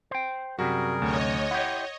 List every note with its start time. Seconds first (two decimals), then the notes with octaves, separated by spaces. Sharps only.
0.11 C5 G5
0.59 F#2 C3 G3 F#4 G#4 A#4
1.02 D2 C#5 D#5
1.51 E4 G4 F#5 C6